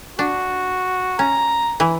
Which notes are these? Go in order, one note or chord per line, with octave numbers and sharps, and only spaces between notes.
D4 F#4
C#4 A#5
E3 E4